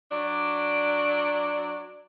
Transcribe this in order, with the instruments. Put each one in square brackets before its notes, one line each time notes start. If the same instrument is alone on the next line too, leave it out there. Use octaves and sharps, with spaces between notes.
[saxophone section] F#3 D4 D5